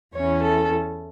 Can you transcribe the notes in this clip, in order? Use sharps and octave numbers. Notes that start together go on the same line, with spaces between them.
E2 E3 C#4 C#5
A4